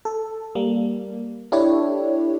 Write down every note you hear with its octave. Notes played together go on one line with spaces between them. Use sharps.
A4
G3 A#3
D4 E4 G4 A4 C#5